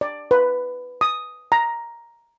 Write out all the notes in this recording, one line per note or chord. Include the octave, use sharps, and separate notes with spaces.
D5
B4
D#6
A#5